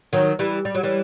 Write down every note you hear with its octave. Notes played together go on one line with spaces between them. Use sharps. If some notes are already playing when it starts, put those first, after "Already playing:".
D#3 F#3
E3 G3
G3
F#3
E3 G3